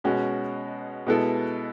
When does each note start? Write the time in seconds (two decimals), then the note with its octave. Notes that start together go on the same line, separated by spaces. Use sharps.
0.04 B2 G#3 C#4 F#4
1.07 B2 G#3 B3 E4 A4